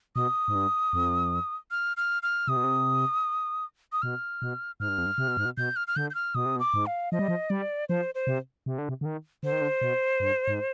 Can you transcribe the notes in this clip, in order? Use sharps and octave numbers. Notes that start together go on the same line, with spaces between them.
B2 D#6
G#2
G2
F2
F6
F6
F6
C3 D#6
B2
C3
D#6
B2 F6
B2
G#2 F6
G2
F2
G2
C3
B2
G#2
B2
B2 G6
F6
F6
D3 G6
G6
F6
B2 D#6
C3
B2
D6
G#2
F5
F3 D#5
G3
F3
G3 D5
F3 C5
C5
C3
C3
D3
C3
D3
D#3
D3 C5
D#3
D3
B2
G2
G#2